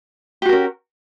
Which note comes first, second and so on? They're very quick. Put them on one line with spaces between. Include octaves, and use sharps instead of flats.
G4 F#4 A#4 C#4